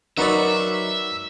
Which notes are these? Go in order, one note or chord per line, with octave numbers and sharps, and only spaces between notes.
F#3 D#4 F#4 A#4 B4 D5 E5